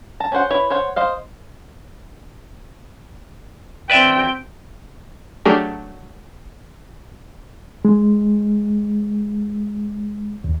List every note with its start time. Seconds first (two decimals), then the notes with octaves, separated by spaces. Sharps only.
0.20 A5 A#5
0.32 C#4 F#4 C5 F#5
0.51 E4 B4 C#5
0.70 C5 C#5 F#5
0.96 C5 D#5 F5
3.90 C4 B4 D5 E5 G5
5.45 F#3 A3 D4 G4 G#4 A#4
7.85 G#3
10.44 D#2